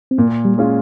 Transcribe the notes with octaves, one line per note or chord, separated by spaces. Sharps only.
C4
A#2 A#3
G3
G#3 C#4 F4